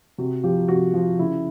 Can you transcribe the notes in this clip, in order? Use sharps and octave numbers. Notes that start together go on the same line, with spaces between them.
C3 F#4
F3 G4
C3 F#4
F3
C#3 E4